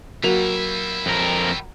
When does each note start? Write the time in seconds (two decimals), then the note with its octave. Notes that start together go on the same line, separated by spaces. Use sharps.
0.23 F#3 G3 A#3 E4 F7
1.06 F2 A#4